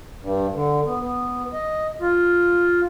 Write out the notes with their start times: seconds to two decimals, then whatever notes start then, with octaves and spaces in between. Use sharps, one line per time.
0.21 G2
0.54 D3
0.85 B3
1.01 B3
1.53 D#5
2.01 F4